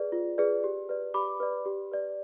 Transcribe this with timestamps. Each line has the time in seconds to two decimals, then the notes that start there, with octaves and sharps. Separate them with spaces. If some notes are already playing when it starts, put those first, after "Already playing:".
Already playing: G#4 B4 D5
0.12 F4
0.38 G#4 B4 D5
0.64 G4
0.89 B4 D5
1.14 G4 B5 D6
1.40 B4 D5
1.66 G4
1.92 B4 D5